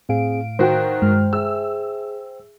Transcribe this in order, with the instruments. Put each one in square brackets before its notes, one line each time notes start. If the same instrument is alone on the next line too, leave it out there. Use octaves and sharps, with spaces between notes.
[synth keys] A2 F5 D7 [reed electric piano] C4 G#4
[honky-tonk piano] D#3 F#4 [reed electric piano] C5 G5
[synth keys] G2 G#3 F6
[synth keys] G#4 E5 [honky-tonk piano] E6